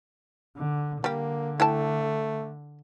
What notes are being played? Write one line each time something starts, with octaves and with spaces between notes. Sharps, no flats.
D3
D3 G3 A#3 G4
A3 E4 G5 A5